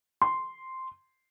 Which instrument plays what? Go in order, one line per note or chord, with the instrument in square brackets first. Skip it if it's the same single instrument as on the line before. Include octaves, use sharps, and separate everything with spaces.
[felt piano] C6